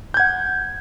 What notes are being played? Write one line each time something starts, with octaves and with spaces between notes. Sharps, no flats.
F#5 G6 G#6